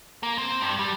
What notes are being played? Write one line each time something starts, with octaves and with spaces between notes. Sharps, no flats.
A#3
C4
G2
G3